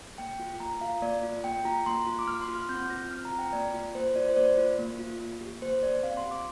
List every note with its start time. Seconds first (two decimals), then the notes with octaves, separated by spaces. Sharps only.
0.18 A#3 G5
0.40 F4
0.60 A#3 A#5
0.81 F4 F5
1.02 A#3 D5
1.23 F4
1.44 A#3 G5
1.65 F4 A#5
1.86 A#3 C6
2.07 F4
2.19 D6
2.27 A#3 F6
2.41 C6
2.48 F4
2.55 F6
2.69 C4 G6
2.90 F4 A#6
3.11 C4 F6
3.25 A#5
3.32 F4
3.39 G5
3.53 A#3 D5
3.74 F4
3.95 A#3 C5
4.16 F4 D5
4.29 C5
4.36 A#3 D5
4.58 F4
4.78 A#3
4.99 F4
5.20 A#3
5.41 G4
5.62 A#3 C5
5.83 G4 D5
6.03 C4 F5
6.17 C6
6.24 F4
6.31 D6